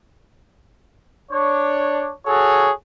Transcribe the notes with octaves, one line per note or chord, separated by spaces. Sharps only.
D4 C#5
F#4 G#4 A4 C#5